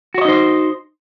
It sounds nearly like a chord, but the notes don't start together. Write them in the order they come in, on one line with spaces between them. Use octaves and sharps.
F#4 C#5 D#5 D#4 C5